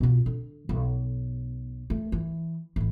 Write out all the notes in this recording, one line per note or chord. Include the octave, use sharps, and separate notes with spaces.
B2 F4
D3
B1
A3
E3
A1 E4